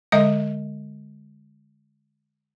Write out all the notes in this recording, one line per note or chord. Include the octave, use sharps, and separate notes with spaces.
D3 G#3 D#5 E5 F#5